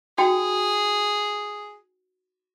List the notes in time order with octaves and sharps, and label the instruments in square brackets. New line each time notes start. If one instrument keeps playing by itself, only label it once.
[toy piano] D#4 F#4 G5 [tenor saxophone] G#4